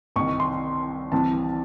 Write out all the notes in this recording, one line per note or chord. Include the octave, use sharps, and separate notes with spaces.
C2 C3 D#3 C#6
C6
C2 C3 E3 A5